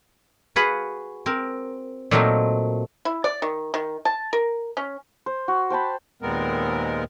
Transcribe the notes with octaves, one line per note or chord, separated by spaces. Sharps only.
F#4 G#4 B4 F5 F#5
C4 A#4
A#2 F#3 A3 C4 D#4 A#4
E4
D5
D#3
D#3
A5
A#4
C#4
C5
F#4
C5 G5 A5 B5
D#2 A#2 G#3 B3 C4 A#4